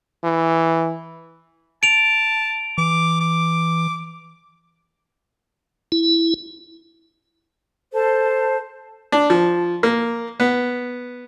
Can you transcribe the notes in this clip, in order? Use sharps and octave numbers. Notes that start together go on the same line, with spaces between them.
E3
A5 D7 F7
E3 D6
D6
E4
A4 C5 A5
D4
F3
A#3
B3